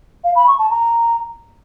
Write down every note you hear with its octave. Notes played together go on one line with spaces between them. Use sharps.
F5
B5
C#6
A5
A#5